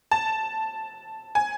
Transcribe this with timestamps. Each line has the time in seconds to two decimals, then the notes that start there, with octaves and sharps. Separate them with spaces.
0.11 A5
1.35 G#5